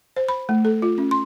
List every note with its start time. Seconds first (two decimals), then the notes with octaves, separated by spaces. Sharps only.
0.16 C5
0.29 B5
0.49 A3
0.65 A4
0.82 F4
0.98 C#4
1.11 C6